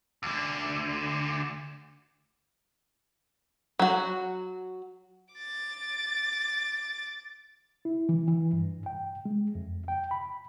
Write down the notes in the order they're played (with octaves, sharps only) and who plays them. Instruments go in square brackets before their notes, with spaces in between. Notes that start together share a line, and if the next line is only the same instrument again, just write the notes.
[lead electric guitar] D2 D3
[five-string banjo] F#3 F#4
[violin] D6 A6
[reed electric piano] E4
E3
E3
G2
G5
G#3
F2
G5
B5